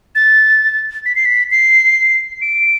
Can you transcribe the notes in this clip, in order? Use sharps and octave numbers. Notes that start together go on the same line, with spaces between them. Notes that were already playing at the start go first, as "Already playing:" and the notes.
A6
B6
C7
B6
C7
D7